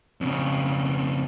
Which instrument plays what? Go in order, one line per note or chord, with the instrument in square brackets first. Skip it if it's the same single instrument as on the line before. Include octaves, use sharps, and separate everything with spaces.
[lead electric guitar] F2 C#3